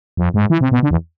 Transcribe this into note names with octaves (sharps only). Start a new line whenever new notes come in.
F2
G#2
E3
C3
B2
D3
E2